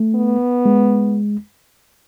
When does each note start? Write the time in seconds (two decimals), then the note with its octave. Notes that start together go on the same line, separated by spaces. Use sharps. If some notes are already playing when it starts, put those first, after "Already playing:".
Already playing: A3
0.15 B3
0.65 G#3